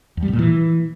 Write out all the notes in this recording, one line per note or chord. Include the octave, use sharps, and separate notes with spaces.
E2
G3
B2
A#2
E3